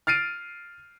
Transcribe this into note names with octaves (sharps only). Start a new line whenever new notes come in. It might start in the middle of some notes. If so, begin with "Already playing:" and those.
F6 A6 C7 D7 D#7